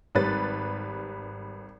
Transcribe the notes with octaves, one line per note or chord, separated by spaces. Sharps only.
G#1 G3 B4 A6